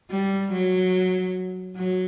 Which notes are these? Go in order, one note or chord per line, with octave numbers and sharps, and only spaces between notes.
G3
F#3
F#3